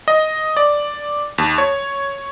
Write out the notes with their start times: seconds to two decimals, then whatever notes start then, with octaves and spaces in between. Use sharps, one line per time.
0.08 D#5
0.57 D5
1.38 D#2
1.58 C#5